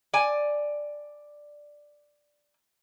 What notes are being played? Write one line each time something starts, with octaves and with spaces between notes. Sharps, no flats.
D5 G#5